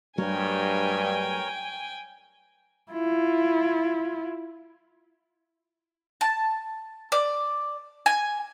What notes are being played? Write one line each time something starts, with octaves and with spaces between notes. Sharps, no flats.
G2 F#3 A3 D4 A#4 C#5 G5 G#5
E4 F4
A5
D5
G#5